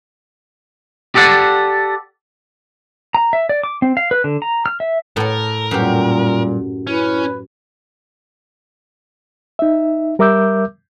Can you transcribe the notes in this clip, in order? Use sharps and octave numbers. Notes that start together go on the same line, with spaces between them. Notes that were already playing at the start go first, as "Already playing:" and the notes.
G4 A4 D5 F#5
A#5
E5
D5
D6
C4
F5
B4
D3
A#5
F6
E5
A2 A4 A#4
F#2 A#2 G3 G4
C#4 E4 B4
D#4 E5
G3 A#4 E5 D6 E6 G6